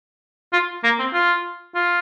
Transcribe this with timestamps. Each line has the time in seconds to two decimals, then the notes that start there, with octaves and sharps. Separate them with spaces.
0.53 F4
0.84 A#3
0.99 C4
1.14 F4
1.75 F4